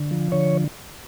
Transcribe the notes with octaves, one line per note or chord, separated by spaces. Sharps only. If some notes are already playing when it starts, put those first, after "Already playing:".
Already playing: D3
F3
D3 C#5